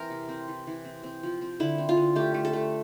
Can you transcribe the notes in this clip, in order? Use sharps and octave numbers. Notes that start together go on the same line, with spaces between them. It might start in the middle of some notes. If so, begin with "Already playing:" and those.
Already playing: E3 C4 A#4
C3
C4
E3
E3
C4
C4
F3
C4
D3 E4
C4
F4
D3
A3 G4
A3
A4
A3